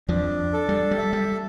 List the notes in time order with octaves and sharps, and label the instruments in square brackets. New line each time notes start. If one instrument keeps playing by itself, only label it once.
[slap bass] F2 F3 [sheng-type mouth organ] D4
[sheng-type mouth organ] A4
[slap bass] G3
G3
[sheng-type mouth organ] E5
[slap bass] G3